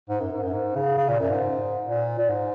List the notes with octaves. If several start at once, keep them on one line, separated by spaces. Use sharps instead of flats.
G#2
F#2
G#2
F#2
G#2
C#3
C#3
A#2
F#2
G#2
A#2
A#2
G#2